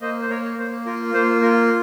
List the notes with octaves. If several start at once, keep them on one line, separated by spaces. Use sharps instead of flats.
A#3 C5 D#5
C5
A#3 A#4 C#5
A#3 C5
F4 A#4
A#3 C5
F4 A#4